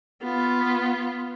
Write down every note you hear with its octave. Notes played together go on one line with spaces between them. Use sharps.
B3 F4